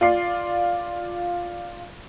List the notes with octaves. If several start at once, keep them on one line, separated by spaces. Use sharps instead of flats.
F4 D5 C7